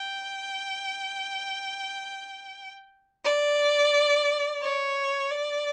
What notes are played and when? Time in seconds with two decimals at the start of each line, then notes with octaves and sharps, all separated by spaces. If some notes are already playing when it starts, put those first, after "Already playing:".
Already playing: G5
3.25 D5
4.62 C#5
5.31 D5